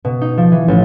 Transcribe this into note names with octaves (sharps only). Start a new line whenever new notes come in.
B2
D#4
F3
E3
A1